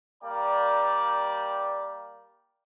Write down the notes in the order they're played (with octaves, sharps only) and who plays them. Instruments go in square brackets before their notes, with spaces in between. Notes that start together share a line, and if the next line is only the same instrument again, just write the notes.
[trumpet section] G3 A#3 D5 G5 A#5